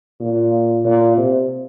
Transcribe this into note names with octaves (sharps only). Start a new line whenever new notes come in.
A#2
A#2
C3